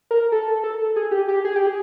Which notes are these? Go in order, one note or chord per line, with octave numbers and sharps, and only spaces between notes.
A#4
A4
A4
G#4
G4
G4
G#4
G4
G#4